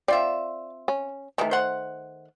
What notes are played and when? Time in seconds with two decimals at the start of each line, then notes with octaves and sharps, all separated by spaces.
0.08 C4 F4 D5 E5
0.88 C#4
1.38 C3 D#3 E3 A3
1.51 C5 F#5